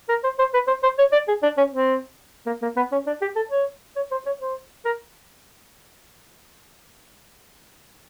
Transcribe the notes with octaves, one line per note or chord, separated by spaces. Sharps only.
A#4
C5
C5
B4
C5
C5
C#5
D5
G#4
D4
C#4
C4
A#3
A#3
B3
C#4
D4
G4
A4
C#5
C#5
C5
C#5
C5
A#4